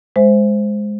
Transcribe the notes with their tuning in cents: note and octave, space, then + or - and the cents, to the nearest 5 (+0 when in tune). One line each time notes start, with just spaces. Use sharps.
G#3 +0 C5 -5 E5 +15